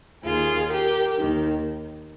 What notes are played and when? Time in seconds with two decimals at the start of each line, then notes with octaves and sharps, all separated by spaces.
0.24 D#2 D#3 F4 G#4
0.70 G4 A#4
1.18 D#2 D#3